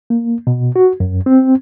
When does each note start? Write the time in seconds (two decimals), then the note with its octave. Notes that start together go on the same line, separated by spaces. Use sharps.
0.10 A#3
0.47 B2
0.76 F#4
1.00 F#2
1.26 C4